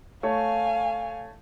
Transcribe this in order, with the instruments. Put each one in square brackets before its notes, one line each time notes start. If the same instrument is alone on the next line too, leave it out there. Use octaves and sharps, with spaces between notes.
[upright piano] A3 C#5 [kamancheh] F5 G#5